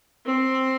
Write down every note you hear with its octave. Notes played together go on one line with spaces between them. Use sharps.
C4